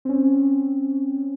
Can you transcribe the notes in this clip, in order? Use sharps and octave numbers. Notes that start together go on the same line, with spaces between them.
C4 C#4